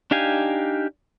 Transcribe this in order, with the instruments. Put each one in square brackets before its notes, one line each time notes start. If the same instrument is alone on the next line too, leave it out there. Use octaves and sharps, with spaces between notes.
[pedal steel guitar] D4 D#4 G4 F5 G#5